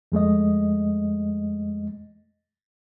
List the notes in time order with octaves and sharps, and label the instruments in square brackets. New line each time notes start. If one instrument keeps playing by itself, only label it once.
[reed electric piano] F2 G#3 A3 D#5